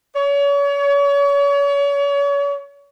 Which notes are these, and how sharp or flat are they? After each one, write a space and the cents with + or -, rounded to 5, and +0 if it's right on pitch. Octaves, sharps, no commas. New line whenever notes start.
C#5 +35